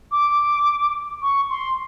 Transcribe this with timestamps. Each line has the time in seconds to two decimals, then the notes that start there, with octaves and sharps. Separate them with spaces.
0.12 D6
1.22 C#6
1.50 C6